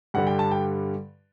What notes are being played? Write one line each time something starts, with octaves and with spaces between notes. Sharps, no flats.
G2 D3 G3 F#5
G5
A5
G5